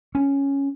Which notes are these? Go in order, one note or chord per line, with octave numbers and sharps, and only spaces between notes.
C#4